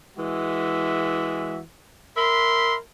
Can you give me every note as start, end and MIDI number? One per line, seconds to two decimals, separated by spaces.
0.18 1.60 52
0.18 1.60 56
0.18 1.60 66
0.18 1.60 76
2.17 2.76 70
2.17 2.76 76
2.17 2.76 83
2.17 2.76 84